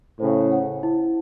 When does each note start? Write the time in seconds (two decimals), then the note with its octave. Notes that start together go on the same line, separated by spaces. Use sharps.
0.20 A2 C#3 C5
0.51 F#5
0.83 E4